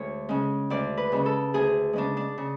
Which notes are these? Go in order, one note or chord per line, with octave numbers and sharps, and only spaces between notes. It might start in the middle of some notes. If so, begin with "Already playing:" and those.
Already playing: D2 G#3 C#5
C#3 G#3 C#4
D2 D5
B4
C#3 G#3 C#4
A4
D2 G#4
C#3 G#3 C#4 D4
D4
C#3